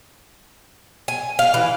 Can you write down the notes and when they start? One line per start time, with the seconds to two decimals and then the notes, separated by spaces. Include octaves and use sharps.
1.08 G#5
1.39 F5
1.54 E3